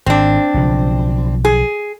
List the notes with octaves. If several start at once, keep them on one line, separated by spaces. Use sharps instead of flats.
G#1 C4 D4
B1 C#3 F3
G#4